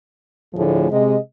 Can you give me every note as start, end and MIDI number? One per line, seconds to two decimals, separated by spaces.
0.54 0.90 38
0.54 0.90 45
0.54 0.90 50
0.54 0.90 53
0.54 0.90 57
0.54 0.90 68
0.91 1.16 48
0.91 1.16 56
0.91 1.16 75